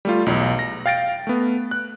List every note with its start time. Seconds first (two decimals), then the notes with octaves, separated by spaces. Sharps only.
0.05 G3 A3 F4
0.26 B1 E2
0.59 A#6
0.86 F5 G5 A6 A#6 D7
1.27 A3 B3
1.71 F#6